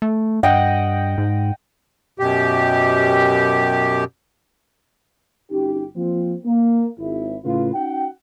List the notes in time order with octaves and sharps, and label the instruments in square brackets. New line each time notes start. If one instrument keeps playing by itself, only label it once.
[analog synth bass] A3
[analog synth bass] G2 [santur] D#5 F#5 G5
[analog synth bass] G#2
[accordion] F#2 B2 G4
[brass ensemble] G1 C#4 D#4 F#4 G4
F3 A#3 C4 F4
A#3
G#1 E4
A2 C#3 F4 B4
C#4 D#4 F#4 F#5 G5